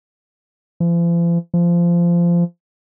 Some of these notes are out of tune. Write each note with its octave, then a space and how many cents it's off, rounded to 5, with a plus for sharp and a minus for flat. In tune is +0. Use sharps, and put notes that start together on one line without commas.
F3 -45
F3 -20